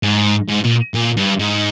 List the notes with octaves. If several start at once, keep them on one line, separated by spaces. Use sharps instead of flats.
G#2
G#2
A#2
A#2
G2
G#2